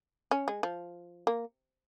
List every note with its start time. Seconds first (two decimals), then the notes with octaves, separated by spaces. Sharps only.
0.31 C#4
0.48 G#3
0.63 F3
1.27 A#3